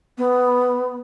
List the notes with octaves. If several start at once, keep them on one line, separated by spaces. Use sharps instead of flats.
B3